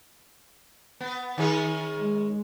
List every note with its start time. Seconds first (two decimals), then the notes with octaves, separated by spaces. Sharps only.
1.00 B3
1.38 D#3 C#4 G#4
1.96 G#3